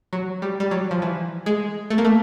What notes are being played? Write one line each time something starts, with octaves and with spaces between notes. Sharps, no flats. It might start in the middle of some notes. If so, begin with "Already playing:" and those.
F#3
G3
G3
F#3
F3
E3
G#3
A3
A#3
A3